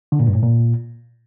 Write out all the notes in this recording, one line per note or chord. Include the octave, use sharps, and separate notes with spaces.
D3
A#2
G2
A2
A#2